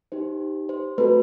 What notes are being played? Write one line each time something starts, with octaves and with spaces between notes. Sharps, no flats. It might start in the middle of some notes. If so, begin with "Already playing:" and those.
D#4 G4 C5
C5
A3 C4 F#4 A4 B4